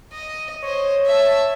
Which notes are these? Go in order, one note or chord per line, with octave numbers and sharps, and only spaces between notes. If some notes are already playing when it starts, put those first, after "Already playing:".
D#5
C5 C#5 D#5
E5 A5